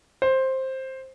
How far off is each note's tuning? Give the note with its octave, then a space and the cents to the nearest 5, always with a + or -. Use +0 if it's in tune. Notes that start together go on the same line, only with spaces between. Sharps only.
C5 +10